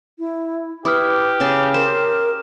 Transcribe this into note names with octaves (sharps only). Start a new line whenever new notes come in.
E4
E4 G4 B4 D6 D#6 F6
C#3 G#4 A5
A#4 C5 E7